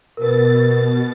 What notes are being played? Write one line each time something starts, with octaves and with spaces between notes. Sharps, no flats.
B2 A#4 B4 A6